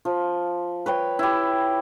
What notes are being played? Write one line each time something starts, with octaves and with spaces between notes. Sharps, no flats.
F3
B4 C#5 G5
E4 G4